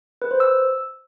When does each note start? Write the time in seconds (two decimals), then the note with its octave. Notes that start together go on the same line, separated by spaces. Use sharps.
0.22 B4
0.31 C5
0.40 E6